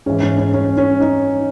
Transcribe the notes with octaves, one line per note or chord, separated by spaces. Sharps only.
G#2 E3 C#4
C#4
C#4
C#4
C#4
D#4